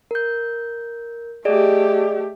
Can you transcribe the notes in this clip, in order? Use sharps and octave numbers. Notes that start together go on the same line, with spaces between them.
A#4 G6
A3 G4 G#4 D5 D#5